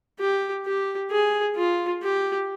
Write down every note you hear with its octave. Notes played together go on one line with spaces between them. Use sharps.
G4
G4
G#4
F4
G4